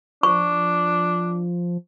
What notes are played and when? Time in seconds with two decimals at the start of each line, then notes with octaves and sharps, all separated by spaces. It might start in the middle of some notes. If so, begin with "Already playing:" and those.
0.23 F3 D4 C#6